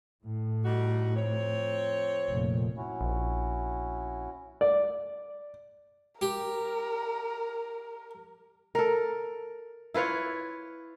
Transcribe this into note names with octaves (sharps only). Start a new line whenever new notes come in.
A2
G3 D#4 F#4
F2 C4 C#5
F1 A#2
C#4 E4 F#4
A#1
D5
G4 A#4
A4 A#4
E4 F4 B4 C#5